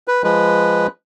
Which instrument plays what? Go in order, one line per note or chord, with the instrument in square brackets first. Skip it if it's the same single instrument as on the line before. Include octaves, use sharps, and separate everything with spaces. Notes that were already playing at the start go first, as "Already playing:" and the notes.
[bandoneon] B4
F3 G#3 B4